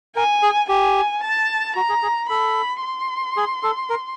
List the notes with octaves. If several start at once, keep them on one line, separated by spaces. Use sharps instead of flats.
A#4 G#5
G#4
G4 G#5
A5
F#4 A#5
G#4
G#4
A4 B5
C6
G#4
A4
A#4